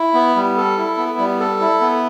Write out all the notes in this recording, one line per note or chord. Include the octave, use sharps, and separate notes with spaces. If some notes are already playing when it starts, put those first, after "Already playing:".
Already playing: E4
B3
G3
A4
E4
B3
G3
A4
E4
B3